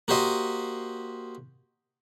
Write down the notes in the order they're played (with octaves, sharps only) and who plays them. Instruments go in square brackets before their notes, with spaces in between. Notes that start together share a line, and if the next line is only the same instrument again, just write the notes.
[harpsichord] A#3 F#4 G4 C5 D#5